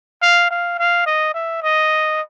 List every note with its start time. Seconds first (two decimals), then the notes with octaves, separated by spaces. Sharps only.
0.22 F5
0.50 F5
0.79 F5
1.06 D#5
1.34 E5
1.62 D#5